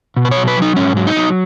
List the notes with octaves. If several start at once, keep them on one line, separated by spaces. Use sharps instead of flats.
B2
B4
C#5
F#3
B4
F#3
D#4
G#2 C#4
F#3
D#4
F#3